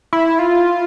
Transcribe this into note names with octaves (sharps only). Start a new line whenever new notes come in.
E4
F4